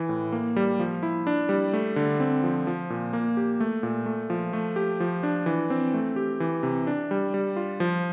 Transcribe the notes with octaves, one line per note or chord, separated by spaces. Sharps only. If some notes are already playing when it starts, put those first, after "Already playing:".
Already playing: E3
A2
A#3
G3
F3
E4
D4
G3
A3
D3
C4
F3
F3
A#2
A#3
G4
A3
A#2
A3
F3
A3
G4
F3
D4
E3
C4
A3
G4
E3
C3
D4
G3
G3
F4
F3